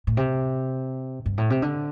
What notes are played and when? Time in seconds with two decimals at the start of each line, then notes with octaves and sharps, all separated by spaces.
0.07 A2
0.17 C3
1.26 G2
1.38 A2
1.50 C3
1.62 D3